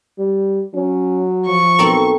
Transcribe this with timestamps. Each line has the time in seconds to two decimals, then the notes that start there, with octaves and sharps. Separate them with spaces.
0.18 G3
0.74 F#3 C#4
1.46 F3 C#6
1.79 B1 C4 A4 A#4